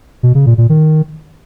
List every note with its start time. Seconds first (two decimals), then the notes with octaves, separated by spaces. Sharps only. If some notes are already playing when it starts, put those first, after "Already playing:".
0.23 B2
0.35 C#3
0.46 A#2
0.58 A#2
0.69 D#3